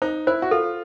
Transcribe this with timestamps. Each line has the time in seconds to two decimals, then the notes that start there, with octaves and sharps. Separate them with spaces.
0.02 D#4 C5
0.27 E4 C5
0.42 F#4
0.51 F4 A4